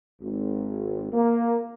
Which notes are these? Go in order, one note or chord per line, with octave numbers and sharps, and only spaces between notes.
G#1
A#3